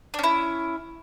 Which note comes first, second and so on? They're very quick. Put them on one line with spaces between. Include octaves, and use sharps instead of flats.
D4 C#4 E4